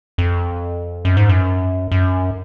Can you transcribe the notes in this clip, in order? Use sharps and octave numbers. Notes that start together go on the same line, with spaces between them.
F2
F#2
G#2
F#2
F#2